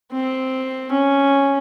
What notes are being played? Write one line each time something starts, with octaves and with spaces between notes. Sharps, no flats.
C4
C#4